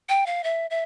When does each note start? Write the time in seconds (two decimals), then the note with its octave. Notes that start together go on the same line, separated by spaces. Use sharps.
0.09 G5
0.26 F5
0.44 E5
0.70 E5